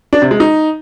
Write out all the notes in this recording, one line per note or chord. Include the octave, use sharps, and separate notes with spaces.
D4
C3
G#3
D#4